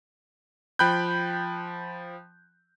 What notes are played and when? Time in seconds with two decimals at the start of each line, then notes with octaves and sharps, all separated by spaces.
0.79 F3 G5 B5 F#6 G6